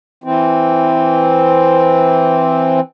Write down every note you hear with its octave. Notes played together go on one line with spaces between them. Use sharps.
E3 C4